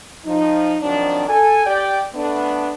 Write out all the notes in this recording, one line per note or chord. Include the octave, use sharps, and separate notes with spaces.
F3 D#4
D#3 F3 F#3 C4 D4
A4 G#5
G4 D5 G5
A3 B3 D4